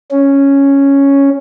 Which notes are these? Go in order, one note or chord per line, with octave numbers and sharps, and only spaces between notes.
C#4